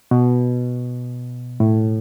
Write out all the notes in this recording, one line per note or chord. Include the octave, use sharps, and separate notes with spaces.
B2
A2